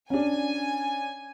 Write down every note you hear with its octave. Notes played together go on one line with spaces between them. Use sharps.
C#4 D4 G#5